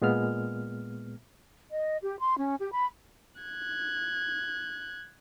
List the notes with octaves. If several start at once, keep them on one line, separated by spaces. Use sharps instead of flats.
A#2 G#3 B3 F6
D#5
G4
C6
C#4
G4
B5
F#6 G#6